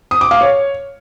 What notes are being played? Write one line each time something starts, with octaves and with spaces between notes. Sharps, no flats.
D#6
D6
F5
C#5